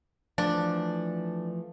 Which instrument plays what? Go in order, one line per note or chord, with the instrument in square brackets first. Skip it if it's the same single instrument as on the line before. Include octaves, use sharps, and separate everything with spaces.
[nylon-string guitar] E3 F3 A3 [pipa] D4